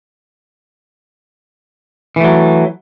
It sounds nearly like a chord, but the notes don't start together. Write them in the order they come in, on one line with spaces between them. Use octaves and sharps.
E3 A3 F#3